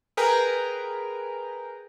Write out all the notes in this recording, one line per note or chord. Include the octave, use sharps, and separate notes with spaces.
G#4 A#4 B4 G5 G#5 A#5